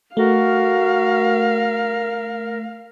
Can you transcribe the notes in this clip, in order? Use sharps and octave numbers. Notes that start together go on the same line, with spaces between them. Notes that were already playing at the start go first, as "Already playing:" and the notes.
A3 F#4 A#4 F5